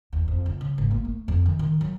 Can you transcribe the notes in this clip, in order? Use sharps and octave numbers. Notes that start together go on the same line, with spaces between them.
E2
F2
C#2
C#3
G#1
A#3
A3
F2
D#3
D#3
F#3